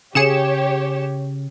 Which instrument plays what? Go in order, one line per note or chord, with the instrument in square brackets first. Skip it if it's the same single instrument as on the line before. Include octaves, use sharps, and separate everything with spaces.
[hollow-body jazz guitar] C#3 [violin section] G4 C#5 [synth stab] G#4 C#7 E7